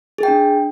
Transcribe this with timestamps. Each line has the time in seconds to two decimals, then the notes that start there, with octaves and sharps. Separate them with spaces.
0.18 G#4
0.23 G5
0.28 D4